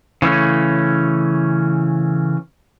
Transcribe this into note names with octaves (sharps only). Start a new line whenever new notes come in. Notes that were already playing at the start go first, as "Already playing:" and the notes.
C#3 E3 A3 C#4